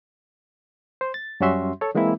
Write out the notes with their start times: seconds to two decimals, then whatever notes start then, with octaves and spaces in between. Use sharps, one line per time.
1.01 C5
1.14 A6
1.40 F#2 G3 C#4 F#4 E5 C6
1.81 A4 C#5
1.95 E3 G#3 A#3 C4 E4